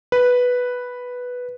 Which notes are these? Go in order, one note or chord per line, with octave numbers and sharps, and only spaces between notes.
B4